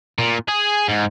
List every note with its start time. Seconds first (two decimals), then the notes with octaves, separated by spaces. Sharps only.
0.18 A#2
0.48 G#4
0.88 G#2